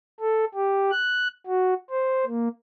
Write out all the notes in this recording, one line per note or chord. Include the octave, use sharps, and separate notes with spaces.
A4
G4
F#6
F#4
C5
A#3